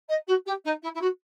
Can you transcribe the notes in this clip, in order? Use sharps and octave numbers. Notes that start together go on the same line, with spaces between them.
D#5
F#4
G4
D#4
E4
E4
F#4